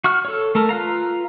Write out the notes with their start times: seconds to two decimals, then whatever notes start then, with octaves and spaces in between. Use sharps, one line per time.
0.04 F#4 C#6 F6
0.25 A4 C#5
0.55 A3 A4 A#4
0.69 F4 B4 F5 A#5